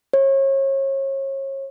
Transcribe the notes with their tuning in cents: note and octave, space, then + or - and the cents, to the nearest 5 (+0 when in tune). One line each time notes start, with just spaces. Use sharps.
C#5 -35